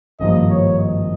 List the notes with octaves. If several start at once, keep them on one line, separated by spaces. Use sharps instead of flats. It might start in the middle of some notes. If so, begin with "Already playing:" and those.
G#1 G2 F3 A#3 D#5
C#5
D#5